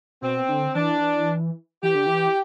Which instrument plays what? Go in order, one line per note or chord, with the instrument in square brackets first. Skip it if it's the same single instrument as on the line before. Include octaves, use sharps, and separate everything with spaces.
[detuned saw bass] B2 [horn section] C4
[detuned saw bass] D3
[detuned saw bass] E3 [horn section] D4
[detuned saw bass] E3 [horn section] G4
[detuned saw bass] D3
E3